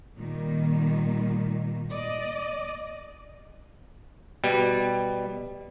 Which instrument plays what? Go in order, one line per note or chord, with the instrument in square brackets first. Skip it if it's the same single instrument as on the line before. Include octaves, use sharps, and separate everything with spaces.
[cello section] A#2 D#3 G3
D5 D#5
[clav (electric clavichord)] B2 G3